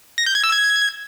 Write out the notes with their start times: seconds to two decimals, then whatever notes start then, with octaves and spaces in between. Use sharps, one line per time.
0.18 A#6
0.26 G6
0.35 G#6
0.44 E6
0.52 G#6